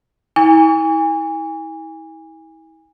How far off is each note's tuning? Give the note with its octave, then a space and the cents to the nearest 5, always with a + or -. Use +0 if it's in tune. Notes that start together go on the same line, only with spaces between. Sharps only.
E4 -40 G#5 -25 C#6 +45